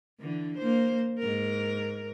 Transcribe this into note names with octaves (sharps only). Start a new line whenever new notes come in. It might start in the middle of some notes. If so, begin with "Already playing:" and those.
D3 E3
A#3 C5
G#2 A#4